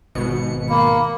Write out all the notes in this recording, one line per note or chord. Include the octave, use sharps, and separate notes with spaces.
G#1 B2 C#7
A#3 B5